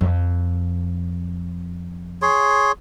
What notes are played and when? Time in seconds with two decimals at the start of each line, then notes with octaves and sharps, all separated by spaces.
0.01 F2
2.22 G#4 C#5 C6